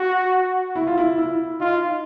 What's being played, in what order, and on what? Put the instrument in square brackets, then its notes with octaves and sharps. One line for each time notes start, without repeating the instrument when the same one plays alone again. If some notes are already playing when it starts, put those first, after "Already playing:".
Already playing: [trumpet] F#4
[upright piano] E4
F4
E4
E4
[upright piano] D#4 [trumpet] F4